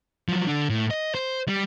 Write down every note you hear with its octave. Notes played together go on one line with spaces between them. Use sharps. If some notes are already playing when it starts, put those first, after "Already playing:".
F3 F#3
D3 D4
A2
D#5
C5
G3